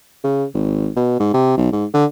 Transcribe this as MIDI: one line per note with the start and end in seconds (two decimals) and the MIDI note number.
0.24 0.45 49
0.54 0.89 32
0.96 1.16 47
1.20 1.31 44
1.34 1.55 48
1.57 1.72 35
1.72 1.85 44
1.94 2.05 50